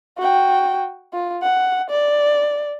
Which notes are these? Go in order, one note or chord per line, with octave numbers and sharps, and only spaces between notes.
F#4 G5
F4
F#5
D5